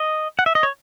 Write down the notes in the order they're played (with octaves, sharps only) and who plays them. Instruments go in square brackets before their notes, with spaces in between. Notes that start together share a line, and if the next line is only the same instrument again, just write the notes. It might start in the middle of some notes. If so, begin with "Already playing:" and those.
Already playing: [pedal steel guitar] D#5
F#5
E5
D#5
C#5